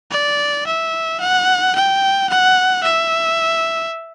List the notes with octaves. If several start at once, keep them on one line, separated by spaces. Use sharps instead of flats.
D5
E5
F#5
G5
F#5
E5